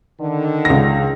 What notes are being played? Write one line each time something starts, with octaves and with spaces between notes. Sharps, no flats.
D3 D#3
C#2 A#6